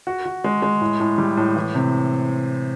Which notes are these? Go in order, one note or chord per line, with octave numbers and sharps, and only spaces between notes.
F#4
F#4
G#3
G#3
A2
A2
G3
A2
E3
C3